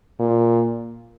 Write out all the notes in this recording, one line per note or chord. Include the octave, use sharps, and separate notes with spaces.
A#2